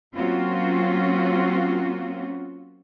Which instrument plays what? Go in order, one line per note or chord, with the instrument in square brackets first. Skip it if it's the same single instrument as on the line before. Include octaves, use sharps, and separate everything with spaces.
[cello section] F#3 A#3 C4 C#4 F4 F#4